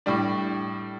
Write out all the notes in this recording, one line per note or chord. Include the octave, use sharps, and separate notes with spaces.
A2 G3 D4